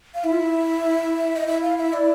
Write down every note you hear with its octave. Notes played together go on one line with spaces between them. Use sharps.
F5
E4 E5
F4
E4
D#5
E4 E5
F5
E5
D5